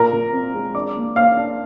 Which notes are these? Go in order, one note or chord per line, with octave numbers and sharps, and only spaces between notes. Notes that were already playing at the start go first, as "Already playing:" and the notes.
Already playing: A#2 A#4 A#5
A#2
C4
G#3
D4 D5 D6
A#3
A#3 F5 F6
D4